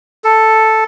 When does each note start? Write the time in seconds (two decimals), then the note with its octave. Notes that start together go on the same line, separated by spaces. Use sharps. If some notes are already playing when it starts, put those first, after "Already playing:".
0.24 A4